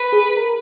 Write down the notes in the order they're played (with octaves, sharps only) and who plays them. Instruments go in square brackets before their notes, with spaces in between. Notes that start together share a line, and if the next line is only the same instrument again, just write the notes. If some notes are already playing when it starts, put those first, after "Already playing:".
Already playing: [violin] B4
[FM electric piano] G#4
A#4